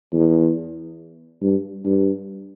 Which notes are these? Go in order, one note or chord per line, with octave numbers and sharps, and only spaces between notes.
E2
G2
G2